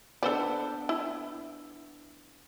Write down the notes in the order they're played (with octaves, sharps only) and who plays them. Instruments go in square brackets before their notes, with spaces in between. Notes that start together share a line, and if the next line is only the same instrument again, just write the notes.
[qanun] B3 D4 [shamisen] A4 C5 D5
[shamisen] E4